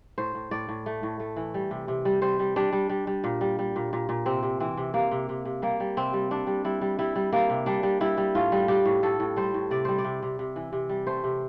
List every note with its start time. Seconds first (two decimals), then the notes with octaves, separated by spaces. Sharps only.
0.18 A2 C5
0.35 A2
0.51 A2 D5
0.69 A2
0.86 A3
1.03 A2
1.20 A3
1.36 E3
1.54 G3
1.71 C3
1.88 C3
2.05 G3
2.22 G3 C5
2.39 G3
2.56 G3 D4
2.72 G3
2.90 G3
3.07 G3
3.24 A#2
3.41 G3
3.59 G3
3.76 A#2
3.93 A#2
4.09 A#2
4.26 C3 C4
4.43 C3
4.60 E3 C4
4.77 C3
4.94 C3 A#3
5.11 C3
5.29 C3
5.45 C3
5.62 G3 A#3
5.80 G3
5.97 C3 C4
6.13 G3
6.31 G3 D4
6.47 G3
6.64 G3 E4
6.81 G3
6.99 G3 E4
7.15 G3
7.33 G3 A#3
7.50 C3
7.66 G3 D4
7.83 G3
8.01 G3 E4
8.17 G3
8.35 A2 F4
8.52 G3
8.68 G3 G4
8.86 A2
9.03 A2 A4
9.20 A2
9.36 G3 C5
9.54 A2
9.71 C3 D5
9.85 G3 C5
9.98 D5
10.04 C3
10.23 C3
10.39 C3
10.56 E3
10.73 C3
10.89 G3
11.07 A3 C5
11.24 C3